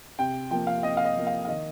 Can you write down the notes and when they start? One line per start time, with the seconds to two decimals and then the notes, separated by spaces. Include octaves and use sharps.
0.18 C3 G5
0.50 F3 A#3 G5
0.67 F5
0.83 C3 D#5
0.97 F5
1.05 D#5
1.15 F3 A#3
1.27 F5
1.45 F5
1.48 D#3 D#5